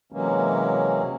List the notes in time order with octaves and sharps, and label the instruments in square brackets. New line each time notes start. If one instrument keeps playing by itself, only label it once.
[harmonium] C3 E3 F#3 G#3 A#3 C#4